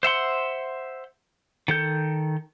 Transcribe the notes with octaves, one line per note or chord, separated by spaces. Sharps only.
C5 E5 F#5 C6
D#3 A4 G6